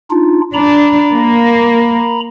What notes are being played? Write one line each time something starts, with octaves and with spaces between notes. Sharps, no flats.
D4 D#4 F4
D4 A#5 B5
A#3